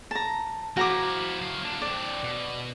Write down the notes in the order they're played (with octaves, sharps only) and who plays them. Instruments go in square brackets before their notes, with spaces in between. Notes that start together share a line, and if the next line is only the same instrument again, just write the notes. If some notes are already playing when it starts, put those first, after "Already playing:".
[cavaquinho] A5 A#5
[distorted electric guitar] F3 E4 [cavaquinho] F#4 A#5 D6
[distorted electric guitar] F#3 F5
A#3 D4
[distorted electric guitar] C4 D4 [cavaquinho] D5
[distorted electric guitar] B2